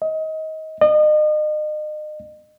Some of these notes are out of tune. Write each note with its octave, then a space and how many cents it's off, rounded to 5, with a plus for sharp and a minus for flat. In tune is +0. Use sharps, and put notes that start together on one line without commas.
D#5 +25
D#5 -35